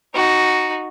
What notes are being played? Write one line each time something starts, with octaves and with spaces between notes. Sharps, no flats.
D#4 F#4